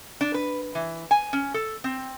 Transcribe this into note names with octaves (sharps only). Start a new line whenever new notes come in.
D4
B4
E3
G#5
C#4
A4
C4